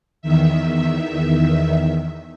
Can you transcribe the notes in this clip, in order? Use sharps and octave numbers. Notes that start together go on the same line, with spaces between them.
E2 D#3 E5